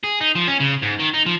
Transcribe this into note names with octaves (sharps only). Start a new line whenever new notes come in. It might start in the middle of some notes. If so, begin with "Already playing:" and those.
G#4
D#4
F3
C#4
C#3
G#2
D#3
D#4
F3